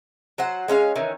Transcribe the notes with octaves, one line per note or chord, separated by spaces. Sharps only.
F#3 C5 F#5
G#3 C#4 D4 F5
D#3 E3 C#4